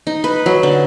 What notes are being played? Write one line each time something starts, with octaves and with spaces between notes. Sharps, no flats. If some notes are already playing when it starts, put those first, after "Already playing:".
D#4
B4
F#3
D3